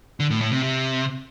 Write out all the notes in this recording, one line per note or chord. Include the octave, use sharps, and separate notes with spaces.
D3
A2
A2
C3
C3